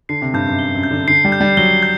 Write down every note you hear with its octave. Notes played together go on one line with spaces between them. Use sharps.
D3 C7
C3
G2 G6
F#2
G7
F#2
G6
D3
D3 C7
G3
G6
G3
F#3 G7
G6